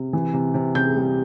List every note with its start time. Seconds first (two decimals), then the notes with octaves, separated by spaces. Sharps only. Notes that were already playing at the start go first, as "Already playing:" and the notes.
Already playing: C3
0.13 E3
0.34 C3
0.54 C3
0.75 C3 G6
0.96 G3